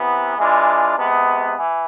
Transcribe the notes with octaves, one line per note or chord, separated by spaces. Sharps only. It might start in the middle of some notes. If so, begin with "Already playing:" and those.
Already playing: C3 E3 B3
E3 G#3 D4 F4
C3 G#3 B3
E3